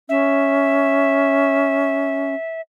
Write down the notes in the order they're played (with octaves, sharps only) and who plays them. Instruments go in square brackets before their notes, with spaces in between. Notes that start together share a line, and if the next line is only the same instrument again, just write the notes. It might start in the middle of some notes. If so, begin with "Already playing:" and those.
[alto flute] C#4 [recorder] E5